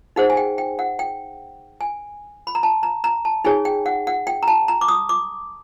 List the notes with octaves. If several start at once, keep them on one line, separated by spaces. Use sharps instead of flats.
D#4 G#4 C5 F#5
G#5
G5
G5
F#5
G5
G#5
B5
A#5
A5
A#5
A#5
A5
D#4 G#4 C#5 G#5
G5
F#5
F#5
G5
A#5
A5
A#5
D6
D#6
D6